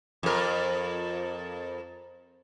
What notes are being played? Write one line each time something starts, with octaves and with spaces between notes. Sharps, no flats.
F2 A#4